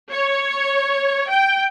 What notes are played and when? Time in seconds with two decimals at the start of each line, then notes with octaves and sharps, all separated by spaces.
0.12 C#5
1.29 G5